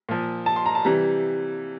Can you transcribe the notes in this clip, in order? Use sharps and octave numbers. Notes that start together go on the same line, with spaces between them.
A#2 F3
A5
C6
A#5
A5
C3 E3 G3 A#5